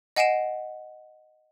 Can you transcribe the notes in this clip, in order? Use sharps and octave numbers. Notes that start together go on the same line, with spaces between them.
D#5 F#5 G#5 C7 D7 E7